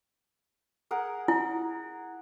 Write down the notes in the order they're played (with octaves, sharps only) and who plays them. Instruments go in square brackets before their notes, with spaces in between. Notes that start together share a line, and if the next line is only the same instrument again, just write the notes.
[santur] G#4 A#4 F#5
[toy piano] E4